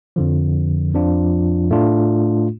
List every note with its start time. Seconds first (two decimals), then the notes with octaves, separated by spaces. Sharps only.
0.16 F2 D3 F3
0.93 F2 F3 D4 F4
1.70 A2 A3 D4 F4